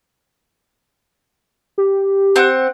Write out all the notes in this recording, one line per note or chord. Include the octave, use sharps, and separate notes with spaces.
G4
C4 F#5